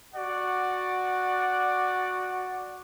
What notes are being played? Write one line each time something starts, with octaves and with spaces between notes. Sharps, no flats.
F#4 D5 F#5